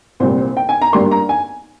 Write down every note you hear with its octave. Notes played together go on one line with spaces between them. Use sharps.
C2 A#2 G3 C5
C5
G5
G#5
A#5
G2 G3 A#3 C6
A#5
G#5